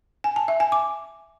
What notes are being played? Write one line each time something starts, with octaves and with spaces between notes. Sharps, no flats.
G#5
A5
E5
G#5
D6